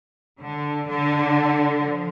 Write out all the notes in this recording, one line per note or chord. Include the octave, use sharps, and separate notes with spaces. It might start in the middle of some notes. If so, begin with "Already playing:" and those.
D3
D3
F3